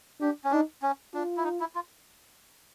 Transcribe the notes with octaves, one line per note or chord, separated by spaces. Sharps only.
D4 G4
C#4
D4 D#4
C#4
D4 F4
E4
D#4
E4
F4